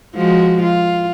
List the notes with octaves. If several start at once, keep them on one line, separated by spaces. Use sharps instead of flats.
F3 G#3 F#4
F4